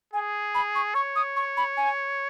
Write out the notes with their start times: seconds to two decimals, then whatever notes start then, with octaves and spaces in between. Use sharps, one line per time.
0.13 G#4 G#5
0.55 B5
0.75 C#6
0.95 C#5 C#6
1.16 D#6
1.36 C#6
1.57 B5
1.77 G#5